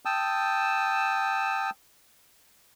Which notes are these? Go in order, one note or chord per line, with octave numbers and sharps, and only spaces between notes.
G5 A5 D#6 E6